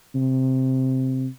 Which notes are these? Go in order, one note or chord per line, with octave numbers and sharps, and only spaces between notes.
C3